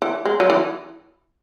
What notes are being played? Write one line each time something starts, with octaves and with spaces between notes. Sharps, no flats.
E3
G#3
F#3
E3